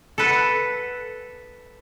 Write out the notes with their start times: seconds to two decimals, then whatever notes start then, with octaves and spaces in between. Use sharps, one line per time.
0.18 A4 B4 F#5